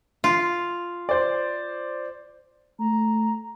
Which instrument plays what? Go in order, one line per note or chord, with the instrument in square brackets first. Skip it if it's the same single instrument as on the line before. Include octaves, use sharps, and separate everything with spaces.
[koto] F4
[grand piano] C5 D5
[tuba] A3 [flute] A#5